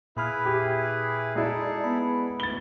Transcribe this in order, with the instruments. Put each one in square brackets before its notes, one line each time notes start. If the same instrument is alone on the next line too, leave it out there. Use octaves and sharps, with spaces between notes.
[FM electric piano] A#2 B5 F6 [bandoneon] E4 G#4 B4
[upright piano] G4
[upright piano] G#3 E4 [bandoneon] D#4 G#4 A4 [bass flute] D5
[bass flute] B3 [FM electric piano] B5
[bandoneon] D2 [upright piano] A6 G7